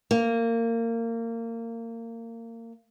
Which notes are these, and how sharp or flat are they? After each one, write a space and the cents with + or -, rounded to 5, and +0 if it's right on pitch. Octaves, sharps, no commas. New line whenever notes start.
A#3 -25